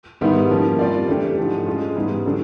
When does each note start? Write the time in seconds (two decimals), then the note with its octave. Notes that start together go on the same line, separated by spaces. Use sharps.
0.21 G#2 D#3 G3 B3 E4
0.50 F3 A#3 C#4
0.79 G3 C4 F4 A#4 D5
1.08 E3 A3 D4 G4
1.38 G#2 F3 A3
1.66 G#3 C#4 F4
1.95 G#2 E3 G3 B3
2.25 D3 F#3 A3 D4